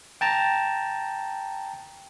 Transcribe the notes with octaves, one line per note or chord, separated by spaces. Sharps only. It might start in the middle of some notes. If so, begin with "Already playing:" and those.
G5 A5 A#5